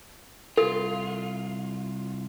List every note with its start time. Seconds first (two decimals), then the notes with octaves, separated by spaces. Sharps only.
0.58 C2 F4 A4